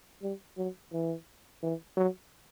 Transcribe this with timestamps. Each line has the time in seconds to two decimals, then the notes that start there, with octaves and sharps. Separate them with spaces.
0.22 G3
0.58 F#3
0.93 E3
1.63 E3
1.97 F#3